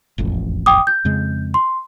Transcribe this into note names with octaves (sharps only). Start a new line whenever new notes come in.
E1 A1 F2
G5 D6 D#6
G6
F2 C#3 G#3
C6